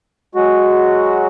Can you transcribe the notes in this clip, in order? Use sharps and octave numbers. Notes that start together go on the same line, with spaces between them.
F#3 G#3 F#4